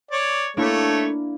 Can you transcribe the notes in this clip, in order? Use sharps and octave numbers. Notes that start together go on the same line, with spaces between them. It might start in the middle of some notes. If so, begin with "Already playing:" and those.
C#5 D5
A3 A#3 D4 E4 C#5